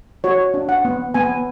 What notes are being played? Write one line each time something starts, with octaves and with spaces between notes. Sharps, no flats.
F#4 C#5
D4
F#5
B3
B3 G#5